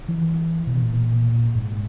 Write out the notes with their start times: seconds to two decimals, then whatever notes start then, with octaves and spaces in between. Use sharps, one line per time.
0.08 E3
0.67 B2
0.82 A#2
1.55 G#2